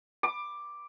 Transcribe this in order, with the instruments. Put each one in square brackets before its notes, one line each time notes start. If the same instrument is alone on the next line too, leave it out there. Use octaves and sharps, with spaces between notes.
[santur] D6